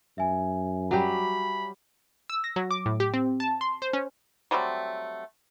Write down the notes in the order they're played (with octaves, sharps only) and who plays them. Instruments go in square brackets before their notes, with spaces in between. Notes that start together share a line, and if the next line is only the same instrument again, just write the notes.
[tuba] F#2 [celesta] E5 G#5
[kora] F#3 G3 G4 [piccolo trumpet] B5
[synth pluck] E6
A#6
F#3
D6
A2
G4
C4
A5
C6
C5
C#4
[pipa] F#3 G3 A3 C4